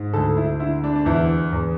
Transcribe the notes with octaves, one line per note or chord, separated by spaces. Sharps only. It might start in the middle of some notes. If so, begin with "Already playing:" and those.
Already playing: G#2
D2 A4
E4
D3 E4
D4
D4
E2 E4
E2